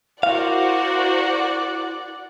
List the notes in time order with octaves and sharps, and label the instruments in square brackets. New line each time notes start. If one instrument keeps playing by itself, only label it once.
[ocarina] E4 [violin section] F#4 A#4 C5 [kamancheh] D5 F#5 [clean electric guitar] F5